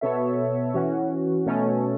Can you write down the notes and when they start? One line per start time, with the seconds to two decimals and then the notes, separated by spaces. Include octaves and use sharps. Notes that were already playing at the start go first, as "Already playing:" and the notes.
0.01 B2 B3 A4 C#5 E5
0.74 E3 C#4 F#4
1.46 B2 A3 C#4 A4